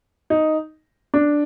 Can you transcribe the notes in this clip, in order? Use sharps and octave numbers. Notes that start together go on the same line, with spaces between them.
D#4
D4